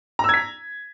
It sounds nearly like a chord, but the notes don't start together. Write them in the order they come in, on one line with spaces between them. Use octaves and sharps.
A#5 E6 G#6 B6